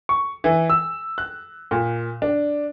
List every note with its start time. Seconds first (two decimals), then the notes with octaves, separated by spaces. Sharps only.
0.09 C#6
0.44 E3
0.70 E6
1.18 F#6
1.71 A#2
2.22 D4